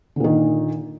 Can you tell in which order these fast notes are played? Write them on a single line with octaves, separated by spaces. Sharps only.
D3 A#2 D#3